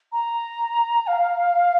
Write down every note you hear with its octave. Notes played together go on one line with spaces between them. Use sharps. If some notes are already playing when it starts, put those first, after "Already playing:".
A#5
F5